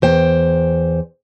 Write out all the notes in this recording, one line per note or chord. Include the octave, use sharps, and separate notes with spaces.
E2 C5 G5